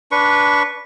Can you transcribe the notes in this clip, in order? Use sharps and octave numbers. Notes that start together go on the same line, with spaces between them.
D4 B4 C#6